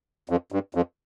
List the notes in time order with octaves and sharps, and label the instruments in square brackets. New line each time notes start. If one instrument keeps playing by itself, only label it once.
[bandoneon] F2
G2
F2